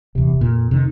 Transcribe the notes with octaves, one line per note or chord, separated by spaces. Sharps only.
D#1 E2 C3
F2 A#2
C3 D#3